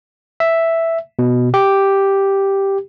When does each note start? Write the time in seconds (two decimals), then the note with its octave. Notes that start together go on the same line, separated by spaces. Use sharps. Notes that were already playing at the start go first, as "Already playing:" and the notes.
0.40 E5
1.19 B2
1.54 G4